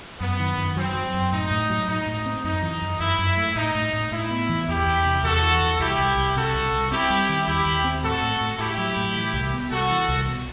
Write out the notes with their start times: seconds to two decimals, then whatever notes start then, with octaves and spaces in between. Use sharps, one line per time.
0.20 F#2 B3
0.40 D#3
0.58 F#2
0.76 F#3 C4
0.95 F#3
1.14 F#2
1.32 A2 D#4
1.51 A2
1.70 F#3
1.88 A2 D#4
2.07 A2
2.26 C4
2.44 F#2 D#4
2.63 E3
2.82 F#2
3.00 F#2 E4
3.19 F#2
3.37 A3
3.56 A2 D#4
3.75 A2
3.93 A2
4.12 A2 E4
4.31 B3
4.49 E3
4.68 E2 E4 G4
4.87 E2
5.05 C3
5.24 E2 F#4 A4
5.43 E3
5.61 E2
5.80 C2 E4 G4
5.99 C2
6.17 C2
6.35 C3 F#4 A4
6.54 C2
6.73 C2
6.91 C4 E4 G4
7.10 G3
7.29 D#3
7.47 D#2 E4 G4
7.66 D#2
7.84 C4
8.03 A2 F#4 A4
8.22 A2
8.41 A2
8.59 A2 E4 G4
8.78 F#3
8.97 A2
9.15 E3
9.34 C2
9.53 B3
9.71 C2 F#4 A4
9.90 E3
10.08 C2
10.27 B2